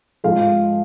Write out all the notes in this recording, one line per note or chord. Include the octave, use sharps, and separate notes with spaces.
G#2 F3 G#3 F5